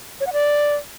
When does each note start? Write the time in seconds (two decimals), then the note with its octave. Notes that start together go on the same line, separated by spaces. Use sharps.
0.21 C#5
0.27 F#5
0.33 D5